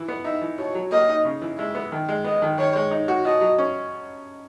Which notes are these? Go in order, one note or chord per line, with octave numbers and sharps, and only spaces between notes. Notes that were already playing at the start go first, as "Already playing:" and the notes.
Already playing: E3
B3
D#4 E5
E3
B2 C#5
F#3
A#3 D#5
D#4
C#3
E3
G#3 E5
B3
D#3
G#3
B3 D#5
D#3
D#3 C#5
G#3
D#4
F#4
B2 D#5
F#3
C#4